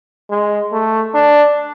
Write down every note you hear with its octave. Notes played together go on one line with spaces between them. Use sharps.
G#3
A3
D4